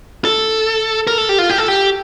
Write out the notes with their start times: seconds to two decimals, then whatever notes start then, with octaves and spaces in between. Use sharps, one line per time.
0.25 A4
1.07 A#4
1.18 A4
1.29 G4
1.38 F4
1.50 G4
1.58 A4
1.68 G4